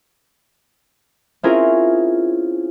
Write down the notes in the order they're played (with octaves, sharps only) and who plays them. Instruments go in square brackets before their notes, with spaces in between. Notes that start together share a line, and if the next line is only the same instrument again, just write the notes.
[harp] C4 C#4 E4 F4 G#4 A#4